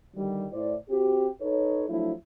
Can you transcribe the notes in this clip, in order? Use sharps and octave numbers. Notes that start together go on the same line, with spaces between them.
D3 D#3 G3
A2 E4 C5 D5
C4 F#4 G4
D#4 A4 B4 C#5
F3 F#3 A3 D4 E4